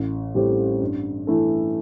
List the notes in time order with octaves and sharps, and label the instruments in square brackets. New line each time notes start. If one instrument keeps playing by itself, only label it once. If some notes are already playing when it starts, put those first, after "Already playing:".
Already playing: [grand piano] A1
A2 G3 C4 G4
G2
E3 A3 E4 A4